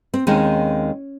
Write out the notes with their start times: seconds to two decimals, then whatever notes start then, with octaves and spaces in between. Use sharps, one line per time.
0.14 C4
0.27 D#2 D#3 G#3 C4 C#4